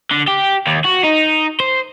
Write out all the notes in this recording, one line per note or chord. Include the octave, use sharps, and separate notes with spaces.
D3
G4
D#2
F#4
D#4
C5